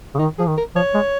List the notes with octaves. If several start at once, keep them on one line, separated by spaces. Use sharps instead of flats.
C#3
D#3 D#4
F3 G#4
D#3
A#4
F3 C#5
G#3